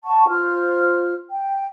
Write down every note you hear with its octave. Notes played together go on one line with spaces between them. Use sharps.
F#5 A5 C#6
F4 C5 F6
G5